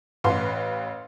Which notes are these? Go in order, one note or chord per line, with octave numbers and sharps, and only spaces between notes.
A1 B4 F5 C6